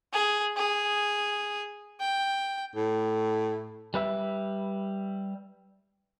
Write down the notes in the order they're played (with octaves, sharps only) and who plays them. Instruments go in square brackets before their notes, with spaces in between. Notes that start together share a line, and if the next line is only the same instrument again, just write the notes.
[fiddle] G#4
G#4
G5
[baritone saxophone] A2
[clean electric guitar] G3 B4 E5